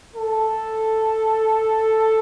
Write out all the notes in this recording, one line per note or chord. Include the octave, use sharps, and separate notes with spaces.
A4